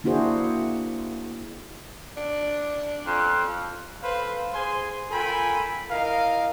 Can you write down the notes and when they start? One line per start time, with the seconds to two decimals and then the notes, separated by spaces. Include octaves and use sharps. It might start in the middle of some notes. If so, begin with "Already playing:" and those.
0.04 A#3 D4 E4 F#4 G#4 C5
2.17 D4
3.07 F2
4.02 A4 B4 C5 F5
4.53 G#4 C5 G#5 C6
5.11 F4 A4 A#4 G5 G#5 B5
5.90 E4 A#4 D#5 F5